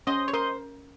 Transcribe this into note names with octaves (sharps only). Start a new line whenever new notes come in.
C#4 C5 D#5
C#5
A#4 C5 D#5